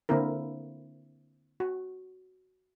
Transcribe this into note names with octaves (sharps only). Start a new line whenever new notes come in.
D3 A#3 C4 E4 A#4
F#4